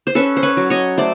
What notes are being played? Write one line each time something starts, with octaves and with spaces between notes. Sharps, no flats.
C5
C#4 A4 B4
C5
B4 C#5
F#3
C#5 D#5
A3 C5 D5